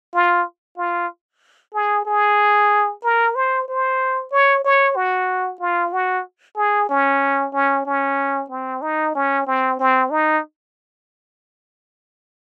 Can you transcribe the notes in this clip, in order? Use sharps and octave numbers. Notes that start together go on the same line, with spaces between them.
F4
F4
G#4
G#4
A#4
C5
C5
C#5
C#5
F#4
F4
F#4
G#4
C#4
C#4
C#4
C4
D#4
C#4
C4
C4
D#4